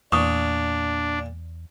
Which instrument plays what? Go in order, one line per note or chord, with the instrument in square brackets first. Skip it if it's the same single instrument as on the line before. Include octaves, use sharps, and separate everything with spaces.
[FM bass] E2 [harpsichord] A#2 [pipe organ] D4 [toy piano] C#6 D#6